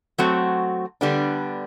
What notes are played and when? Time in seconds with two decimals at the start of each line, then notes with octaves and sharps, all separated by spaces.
0.18 F#3 A3 C4 F#4
1.01 D3 G3 B3 D4